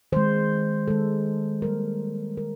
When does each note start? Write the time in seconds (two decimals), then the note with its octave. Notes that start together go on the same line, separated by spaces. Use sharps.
0.12 D#3 G#3 C5
0.88 D#3 G#3 A4
1.62 D#3 G3 A#3 A#4
2.37 D#3 G3 A#4